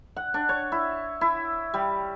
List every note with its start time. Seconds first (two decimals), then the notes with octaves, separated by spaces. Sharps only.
0.16 F#5
0.34 D4
0.49 C#5
0.72 E4
1.21 E4
1.74 G3